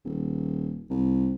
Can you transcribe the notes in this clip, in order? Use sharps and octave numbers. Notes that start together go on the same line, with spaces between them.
D#1
C2